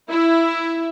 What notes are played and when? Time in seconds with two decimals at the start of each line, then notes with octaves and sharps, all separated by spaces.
0.11 E4